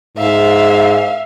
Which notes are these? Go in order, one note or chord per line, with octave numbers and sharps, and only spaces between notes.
G#2 E5 F5